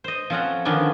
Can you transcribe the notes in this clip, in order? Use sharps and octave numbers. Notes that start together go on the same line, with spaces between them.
C5 D#5
F3 C4 C#4 A4 F#5 A#5
D3 D#3 F3 B3 C#4 D4